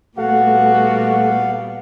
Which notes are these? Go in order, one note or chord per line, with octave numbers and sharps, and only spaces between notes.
A#2 G3 A3 B3 F#4 A4 F5 F#5